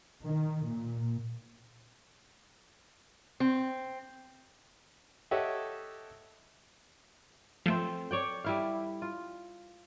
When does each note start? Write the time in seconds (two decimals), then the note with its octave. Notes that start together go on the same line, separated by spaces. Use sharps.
0.23 D#3
0.66 A#2
3.40 C4
5.31 G4 A4 C#5 D#5 E5 F#5
7.66 F3 A3 C4 A4
8.11 C#5 D5 G5
8.44 G3 E4 F5
9.02 F4